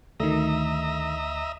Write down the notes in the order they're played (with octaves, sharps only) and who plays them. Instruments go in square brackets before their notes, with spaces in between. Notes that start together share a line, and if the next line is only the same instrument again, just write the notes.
[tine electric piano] D2 [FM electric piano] D#3 A3 [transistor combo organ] D#5 E5 A#5